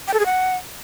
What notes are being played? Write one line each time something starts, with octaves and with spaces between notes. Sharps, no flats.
G5
A4
G#4
F#5